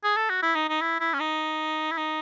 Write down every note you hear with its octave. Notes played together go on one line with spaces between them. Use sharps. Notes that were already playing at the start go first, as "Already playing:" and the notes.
G#4
A4
F#4
E4
D#4
D#4
E4
E4
C#4
D#4
E4
D#4